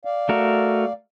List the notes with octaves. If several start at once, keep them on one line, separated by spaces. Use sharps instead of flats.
D5 F5
A3 F#4 A#4